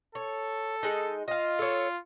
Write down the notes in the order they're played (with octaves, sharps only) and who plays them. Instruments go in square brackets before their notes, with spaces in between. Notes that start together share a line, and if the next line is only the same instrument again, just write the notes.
[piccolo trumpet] A4 [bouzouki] C#5
[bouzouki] G#3 D#4
[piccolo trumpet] F4 [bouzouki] D#5 F5
[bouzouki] A4 C#5